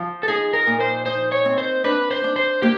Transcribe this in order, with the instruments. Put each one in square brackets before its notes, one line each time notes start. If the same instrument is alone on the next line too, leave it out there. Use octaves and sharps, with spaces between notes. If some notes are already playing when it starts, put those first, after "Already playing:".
Already playing: [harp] F3
[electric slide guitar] A4
[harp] D#4 [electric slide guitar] G#4
[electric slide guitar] A#4
[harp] A#2
[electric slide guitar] C5
[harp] D#4 [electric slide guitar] C5
[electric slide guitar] C#5
[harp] C4
[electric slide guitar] C5
[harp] D4 [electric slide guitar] B4
[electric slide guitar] C5
[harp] D4
[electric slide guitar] C5
[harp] A#3 [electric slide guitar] G4